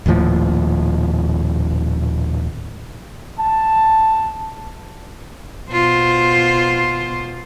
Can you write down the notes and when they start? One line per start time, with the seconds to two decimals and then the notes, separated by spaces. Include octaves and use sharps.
0.06 D#1 D#2 A2 F3
3.39 A5
5.72 B2 F4 C5